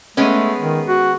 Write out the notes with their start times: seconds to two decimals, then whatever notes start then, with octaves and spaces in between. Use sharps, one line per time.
0.17 G#3 A3 B3 C#4
0.61 D#3
0.87 F#4